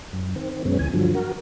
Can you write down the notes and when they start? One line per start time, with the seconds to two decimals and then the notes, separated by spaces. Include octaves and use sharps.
0.13 F#2
0.36 D#3 C4
0.65 F#2 B2 G#3 B3 C#4
0.79 D2 E3 G#5
0.94 G2 D3 F3 F#3
1.15 F#4 A#4